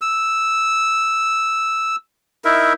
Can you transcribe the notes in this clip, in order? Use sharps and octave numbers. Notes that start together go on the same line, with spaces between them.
E6
D#4 E4 A#4 E5